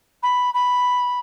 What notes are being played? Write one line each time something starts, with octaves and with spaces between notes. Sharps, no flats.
B5
B5